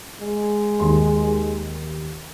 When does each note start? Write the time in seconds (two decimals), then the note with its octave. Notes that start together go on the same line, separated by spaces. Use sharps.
0.21 G#3
0.80 D#2 C6